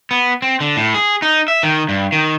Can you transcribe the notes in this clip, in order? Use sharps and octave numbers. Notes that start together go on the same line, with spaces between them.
B3
C4
D3
A2
G#4
D#4
E5
D#3
G2
D#3